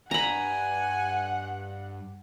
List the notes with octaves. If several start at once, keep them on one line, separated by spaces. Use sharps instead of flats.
G2 F#5 G#5 A#5 B5